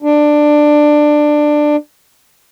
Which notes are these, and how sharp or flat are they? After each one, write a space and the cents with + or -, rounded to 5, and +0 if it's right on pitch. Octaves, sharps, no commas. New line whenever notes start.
D4 +15